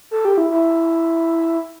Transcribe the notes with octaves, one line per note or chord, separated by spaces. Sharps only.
A4
G4
E4
E4